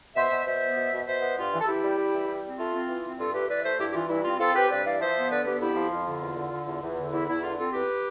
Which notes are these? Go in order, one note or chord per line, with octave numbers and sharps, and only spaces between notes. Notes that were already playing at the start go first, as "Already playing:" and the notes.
B2 C5 E5
B2
B2 C5 E5
B3
B2
B2
B2 C5 E5
B3
G2 F4
E3
A4
E3 E4 G4
G3
G3
E3
G3
C4
A3 F4
C4
E3
C4
G2 F4 A4
A3 G4 B4
E3 B4 D5
A3 C5 E5
G2 E4 G4
G4
E3 F4
G2 E4
C4 F4
C4 F4 A4
C4 G4 B4
G2 B4 D5
E3 D5 F5
F3 C5 E5
B3
D3 B4 D5
B3 G4 B4
F2 E4 G4
F3
F2 F4
D3
E2
D3
D3
E2
E2
D3
E2 E4
E2 E4
D3 F4
C4 F4 A4
E2 G4 B4